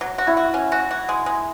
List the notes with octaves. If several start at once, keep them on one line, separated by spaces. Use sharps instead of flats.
F#3
F#4
E4
F#4
C#4
F#4
F#4
G#3
G#3